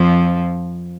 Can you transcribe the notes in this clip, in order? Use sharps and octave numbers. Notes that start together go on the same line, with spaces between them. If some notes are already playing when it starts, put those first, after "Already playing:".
Already playing: F2 F3